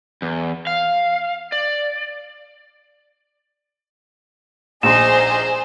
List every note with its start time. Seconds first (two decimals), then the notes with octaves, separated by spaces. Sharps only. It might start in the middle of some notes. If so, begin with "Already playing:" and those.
0.22 E2
0.67 F5
1.52 D5
4.83 A#1 D#4 G#4 C5 C6 E7